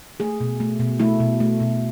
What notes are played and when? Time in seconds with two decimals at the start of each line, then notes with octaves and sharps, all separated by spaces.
0.20 A3 G#4
0.40 B2
0.60 A3
0.80 B2
1.00 A3 E4
1.20 B2
1.40 A3
1.60 B2